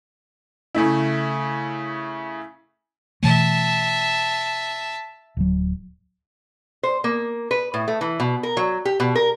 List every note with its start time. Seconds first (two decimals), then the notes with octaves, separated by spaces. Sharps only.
0.75 C#3 A3 E4
3.23 B2 E3 A3 E5 A5
5.37 D1 F#3
6.83 C5
7.04 A#3
7.51 B4
7.74 A2
7.88 A3
8.01 E3
8.20 B2
8.43 A#4
8.57 F#3
8.85 G4
9.00 B2
9.15 A#4